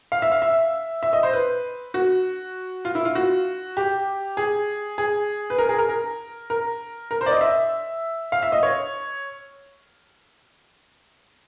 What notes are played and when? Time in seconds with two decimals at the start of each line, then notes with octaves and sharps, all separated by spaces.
0.12 F5
0.22 E5
0.32 F5
0.42 E5
1.03 E5
1.13 D#5
1.23 C5
1.33 B4
1.94 F#4
2.85 F4
2.95 E4
3.05 F4
3.15 F#4
3.77 G4
4.37 G#4
4.98 G#4
5.50 B4
5.58 A#4
5.69 G#4
5.79 A#4
5.89 A#4
6.50 A#4
7.11 A#4
7.21 C5
7.26 D5
7.31 D#5
7.41 E5
8.32 F5
8.43 E5
8.52 D#5
8.63 C#5